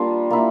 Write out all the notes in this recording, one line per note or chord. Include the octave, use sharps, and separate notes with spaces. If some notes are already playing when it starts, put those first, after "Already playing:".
Already playing: G3 A#3 D4 F4
A#3 E4